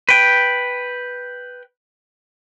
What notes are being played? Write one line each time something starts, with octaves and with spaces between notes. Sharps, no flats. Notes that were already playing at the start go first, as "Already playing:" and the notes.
B4 G5